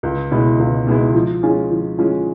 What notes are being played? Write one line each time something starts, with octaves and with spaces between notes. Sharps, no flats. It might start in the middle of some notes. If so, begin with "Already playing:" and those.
C#2
B2 G#3 B3 E4
C#2
B2 G#3 B3 E4
F3
G#3 C#4 F4 G#4
F3
G#3 C#4 F4 G#4